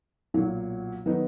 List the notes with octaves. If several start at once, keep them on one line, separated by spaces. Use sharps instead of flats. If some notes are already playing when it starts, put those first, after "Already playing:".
B1 A#2 F#3
D#3 F#3 B3 D#4